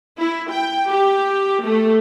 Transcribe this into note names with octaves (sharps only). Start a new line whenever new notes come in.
E4
G5
G4
A3